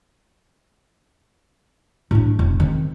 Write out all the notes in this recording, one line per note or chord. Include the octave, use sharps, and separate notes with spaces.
A2 D4
E1
D#3 C4